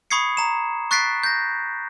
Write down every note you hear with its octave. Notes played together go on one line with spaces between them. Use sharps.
B5 C#6 D#6 G#6 C7 C#7
A#5 E7
C#6 F#6 A6 B6 C7 D7
G6 A#6